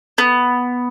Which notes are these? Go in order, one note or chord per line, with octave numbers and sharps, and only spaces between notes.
B3